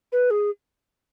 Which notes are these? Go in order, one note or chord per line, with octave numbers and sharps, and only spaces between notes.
B4
G#4